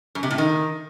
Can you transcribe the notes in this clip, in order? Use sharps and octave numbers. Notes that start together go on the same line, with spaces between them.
F#2
C3
A2
D#3